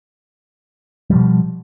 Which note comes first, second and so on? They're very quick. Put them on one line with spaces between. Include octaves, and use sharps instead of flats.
G3 F3 B2